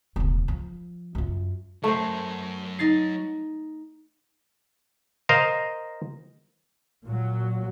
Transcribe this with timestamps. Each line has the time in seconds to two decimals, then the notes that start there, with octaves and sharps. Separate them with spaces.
0.16 E1 D2
0.48 F3
1.15 F#2 F4
1.84 F#3 A3 A#4 C5
2.79 D#4 A6 C7
5.29 A#4 C5 D#5 F5
7.05 A#2 F#3